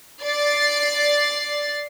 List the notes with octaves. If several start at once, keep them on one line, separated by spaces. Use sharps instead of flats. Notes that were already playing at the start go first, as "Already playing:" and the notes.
D5 A6 C7